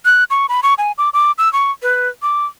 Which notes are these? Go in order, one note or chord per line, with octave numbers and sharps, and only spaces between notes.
F#6
C#6
B5
C#6
G#5
D6
D6
E6
C#6
B4
D6